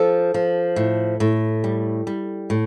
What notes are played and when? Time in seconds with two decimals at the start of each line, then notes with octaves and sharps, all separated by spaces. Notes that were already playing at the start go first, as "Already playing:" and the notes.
Already playing: F3 A4
0.34 F3
0.76 A2
1.20 A2
1.64 G3
2.07 G3
2.50 A2